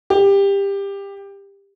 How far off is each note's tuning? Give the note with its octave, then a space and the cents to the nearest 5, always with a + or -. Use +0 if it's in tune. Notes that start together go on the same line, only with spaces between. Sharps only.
G4 +20